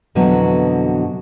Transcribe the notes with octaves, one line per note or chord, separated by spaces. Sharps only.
F2 B2 D3 E3 F#3 B3